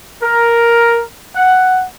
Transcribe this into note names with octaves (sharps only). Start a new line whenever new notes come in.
A#4
F#5